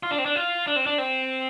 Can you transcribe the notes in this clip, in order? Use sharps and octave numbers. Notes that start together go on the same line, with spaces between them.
F4
D4
C4
D4
F4
D4
C4
D4
C4